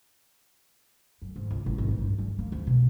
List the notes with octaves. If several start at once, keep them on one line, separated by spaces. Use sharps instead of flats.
F#2
G#2
C#2
A1
G#1
D#4
G2
G3
A#3
D2
B2